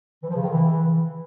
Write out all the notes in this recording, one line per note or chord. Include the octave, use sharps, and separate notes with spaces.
E3
F3
C#3
D#3
E3